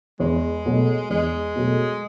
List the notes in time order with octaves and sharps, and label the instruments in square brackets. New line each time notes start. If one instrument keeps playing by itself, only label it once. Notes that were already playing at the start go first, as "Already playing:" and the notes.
[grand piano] E2 [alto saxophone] G#3
[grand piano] B2 F#3 A3
[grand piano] E2 [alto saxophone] G#3
[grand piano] B2 F#3 A3